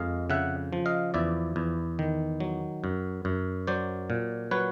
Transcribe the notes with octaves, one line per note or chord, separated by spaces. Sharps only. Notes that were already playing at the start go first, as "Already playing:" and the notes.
Already playing: F2 G#3 D#5 F5
C#3 E5 F#5
F3
D#5 F5
E2 D5 E5
E2
D#3
F#3
F#2
F#2
F#3 C5 D5
A#2
F#3 B4 C#5